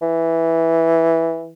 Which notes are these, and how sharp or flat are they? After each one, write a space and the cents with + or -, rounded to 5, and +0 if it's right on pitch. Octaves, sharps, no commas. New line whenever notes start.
E3 -5